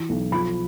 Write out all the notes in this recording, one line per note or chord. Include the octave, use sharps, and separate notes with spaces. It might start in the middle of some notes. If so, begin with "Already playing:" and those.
Already playing: E3
B1
F3 B5